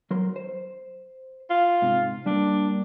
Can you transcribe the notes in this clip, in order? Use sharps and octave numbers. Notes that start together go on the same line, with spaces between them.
F#3 A#4 C6
C5
F4
G#2 C3
G3 A#3 D4